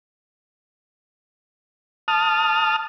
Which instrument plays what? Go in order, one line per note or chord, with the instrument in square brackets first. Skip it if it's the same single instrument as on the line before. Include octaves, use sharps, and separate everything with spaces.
[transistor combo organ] A5 D#6 F6